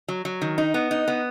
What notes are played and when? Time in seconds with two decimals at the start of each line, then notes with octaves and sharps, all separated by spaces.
0.08 F#3
0.25 F#3
0.42 D#3
0.58 D#4
0.74 B3
0.91 D#4
1.08 B3